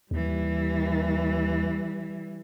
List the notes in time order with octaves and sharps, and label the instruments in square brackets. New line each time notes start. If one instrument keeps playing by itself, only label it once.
[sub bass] D#2 [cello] E3 G3